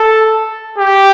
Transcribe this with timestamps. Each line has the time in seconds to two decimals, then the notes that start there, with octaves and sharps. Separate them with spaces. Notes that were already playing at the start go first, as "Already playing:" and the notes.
Already playing: A4
0.78 G4